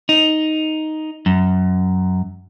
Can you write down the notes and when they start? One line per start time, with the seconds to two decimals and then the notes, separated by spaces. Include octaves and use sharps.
0.09 D#4
1.26 F#2